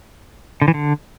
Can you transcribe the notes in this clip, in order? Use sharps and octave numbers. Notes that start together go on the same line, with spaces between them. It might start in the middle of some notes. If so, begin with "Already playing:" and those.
D3
E3
D3